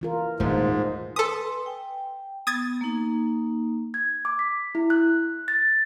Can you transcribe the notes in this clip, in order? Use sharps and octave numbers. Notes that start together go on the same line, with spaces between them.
E3 F4 A#4
D#1 G#2 F3 A3
A4 B4 G#5 C6 D#6
G5
B3 D#6 G#6 A6
A#3 D#4
G#6
D6
B6
E4
F#6
A6